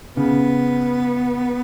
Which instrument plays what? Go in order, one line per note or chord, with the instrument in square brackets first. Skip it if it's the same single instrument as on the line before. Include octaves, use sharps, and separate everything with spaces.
[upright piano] C#3 [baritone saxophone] B3